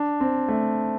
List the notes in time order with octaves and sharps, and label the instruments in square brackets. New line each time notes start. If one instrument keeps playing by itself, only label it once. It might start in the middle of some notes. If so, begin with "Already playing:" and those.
Already playing: [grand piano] D4
C4
A3